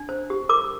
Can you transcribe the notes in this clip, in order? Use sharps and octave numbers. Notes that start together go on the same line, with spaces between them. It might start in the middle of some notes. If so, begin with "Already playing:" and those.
Already playing: D4
C5
G4
A#4 D6